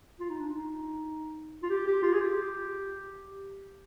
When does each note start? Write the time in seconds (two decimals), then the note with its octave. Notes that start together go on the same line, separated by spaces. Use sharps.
0.20 F4
0.30 D#4
0.40 D4
0.49 D#4
1.63 F4
1.70 G4
1.86 G4
2.03 F4
2.14 G#4
2.21 G4